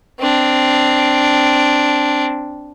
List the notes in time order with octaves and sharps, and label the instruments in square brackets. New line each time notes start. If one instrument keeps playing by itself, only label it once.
[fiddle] C4 D4